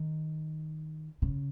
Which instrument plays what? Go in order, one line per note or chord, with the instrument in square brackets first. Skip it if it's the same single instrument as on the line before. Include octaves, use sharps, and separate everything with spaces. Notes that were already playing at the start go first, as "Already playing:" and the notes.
Already playing: [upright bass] D#3
C#3